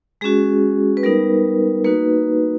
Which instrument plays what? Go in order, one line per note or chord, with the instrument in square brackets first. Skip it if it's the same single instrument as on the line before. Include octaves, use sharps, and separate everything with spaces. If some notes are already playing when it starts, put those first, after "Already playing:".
[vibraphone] G#3 C#4 F#4 G#4
B4
G3 B3 D#4 A#4
A#3 D#4 F#4 B4